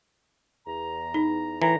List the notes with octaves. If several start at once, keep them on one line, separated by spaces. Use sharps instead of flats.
E2 A#5
D#4
A2 E3 A#5